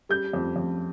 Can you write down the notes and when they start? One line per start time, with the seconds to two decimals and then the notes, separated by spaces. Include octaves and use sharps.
0.09 G3 G6
0.33 F2
0.56 F2